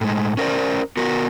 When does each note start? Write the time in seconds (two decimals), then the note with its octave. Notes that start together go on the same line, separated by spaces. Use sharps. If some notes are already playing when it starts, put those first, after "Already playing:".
0.01 A2 G#3
0.37 C#4 A#4 C5 D5
0.97 B3 F#4 A#4